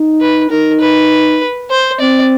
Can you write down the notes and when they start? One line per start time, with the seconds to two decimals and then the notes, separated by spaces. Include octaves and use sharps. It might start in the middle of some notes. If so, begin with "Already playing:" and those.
Already playing: D#4
0.21 B4
0.50 D#4 A#4
0.81 B4
1.70 C5
2.00 C4 D5